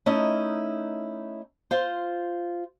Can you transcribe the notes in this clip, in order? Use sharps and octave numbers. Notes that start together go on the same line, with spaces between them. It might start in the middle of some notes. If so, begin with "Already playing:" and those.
A3 C#4 D#4 E4 A#4 D#5
F4 C5